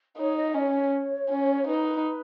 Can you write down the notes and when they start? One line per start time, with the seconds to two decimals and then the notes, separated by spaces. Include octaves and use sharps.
0.18 D#4 C#5
0.36 D#5
0.54 C#4 C#5 D#5
1.30 C#4
1.67 D#4 B4